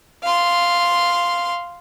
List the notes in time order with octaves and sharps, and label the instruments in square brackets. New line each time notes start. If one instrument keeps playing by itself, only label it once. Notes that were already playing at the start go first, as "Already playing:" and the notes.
[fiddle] F5 C6